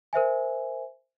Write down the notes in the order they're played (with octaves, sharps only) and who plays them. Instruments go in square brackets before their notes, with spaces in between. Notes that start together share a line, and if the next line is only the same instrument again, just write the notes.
[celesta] A#4 C5 E5 G#5